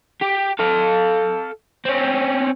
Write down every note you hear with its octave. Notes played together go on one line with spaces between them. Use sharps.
G4
A4 F5
C4 C#4